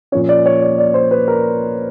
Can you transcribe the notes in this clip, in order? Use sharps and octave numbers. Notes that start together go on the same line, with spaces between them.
A#2 F3 A#3 C#4 C#5
D5
C#5
D5
D5
C5
B4
A#4